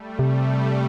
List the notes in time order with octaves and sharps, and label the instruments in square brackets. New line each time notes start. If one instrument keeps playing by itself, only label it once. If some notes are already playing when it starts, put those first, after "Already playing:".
Already playing: [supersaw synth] G3 A3
[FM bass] C3